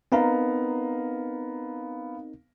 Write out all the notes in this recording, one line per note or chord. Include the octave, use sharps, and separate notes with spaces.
B3 C4 D#4 A#4 F5 A#5